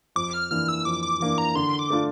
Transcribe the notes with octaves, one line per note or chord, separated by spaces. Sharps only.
F2 D6
F6
E3 A#3 D4 F6
E6
F2 D6
D6
E3 A#3 D4 D6
A#5
D3 C6
D6
A3 D4 F4